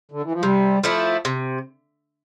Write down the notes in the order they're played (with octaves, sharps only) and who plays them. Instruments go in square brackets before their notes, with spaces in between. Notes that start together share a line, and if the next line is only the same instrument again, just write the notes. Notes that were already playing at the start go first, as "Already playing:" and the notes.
[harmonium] D3
E3
F3
[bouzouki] C3 [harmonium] G3
[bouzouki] F3 A3 E4
C3